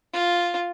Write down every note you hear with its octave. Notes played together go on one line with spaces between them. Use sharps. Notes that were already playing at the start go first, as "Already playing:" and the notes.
F4